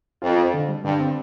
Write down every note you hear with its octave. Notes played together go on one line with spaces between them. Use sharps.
F2 F4
C4
D3
G3
G2 D3
C4